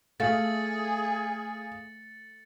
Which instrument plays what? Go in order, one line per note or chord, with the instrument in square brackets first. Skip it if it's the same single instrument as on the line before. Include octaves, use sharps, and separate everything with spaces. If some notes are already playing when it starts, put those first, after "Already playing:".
[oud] A3 [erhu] G#4 [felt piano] F5 [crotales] A6 C#7 F#7